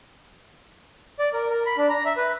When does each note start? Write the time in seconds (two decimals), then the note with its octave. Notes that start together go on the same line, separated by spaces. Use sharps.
1.19 D5
1.33 A#4
1.50 A#4
1.66 B5
1.78 D4
1.90 A#5
2.05 E5
2.17 B4